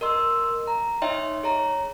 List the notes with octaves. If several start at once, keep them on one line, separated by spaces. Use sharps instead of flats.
A#4 D#5 C6 E6
A#5
D#4 C#5 D#5 E5 G5 C6
G#4 C#5 A#5